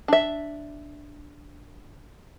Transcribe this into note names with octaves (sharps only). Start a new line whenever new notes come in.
D4 E5